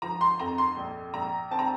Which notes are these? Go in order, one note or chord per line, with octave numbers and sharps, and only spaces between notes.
F3 A#5
C6
F2 A#5
C6
A#1
A#1 A#5
C4 A5
A#5